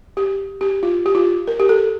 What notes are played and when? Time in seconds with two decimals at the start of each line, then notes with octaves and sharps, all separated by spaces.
0.17 G4
0.61 G4
0.83 F4
1.06 G4
1.15 F4
1.47 A#4
1.60 G4
1.69 A4